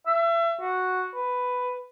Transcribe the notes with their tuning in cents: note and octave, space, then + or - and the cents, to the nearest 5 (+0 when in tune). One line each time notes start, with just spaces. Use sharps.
E5 +35
F#4 -5
B4 +10